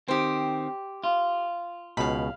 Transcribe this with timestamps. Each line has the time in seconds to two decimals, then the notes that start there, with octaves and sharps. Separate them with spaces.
0.08 D#3 C4 G4 C5
1.04 F4
1.97 C#2 B2 F5 B5